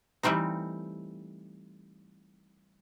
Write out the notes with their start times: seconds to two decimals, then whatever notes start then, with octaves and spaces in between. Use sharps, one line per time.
0.23 E3 G3 A3 C4 D#4